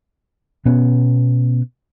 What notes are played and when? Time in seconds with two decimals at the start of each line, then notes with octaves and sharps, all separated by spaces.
0.66 B2 B3 C#4